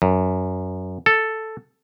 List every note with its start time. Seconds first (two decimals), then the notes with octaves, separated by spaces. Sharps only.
0.02 F#2
1.06 A4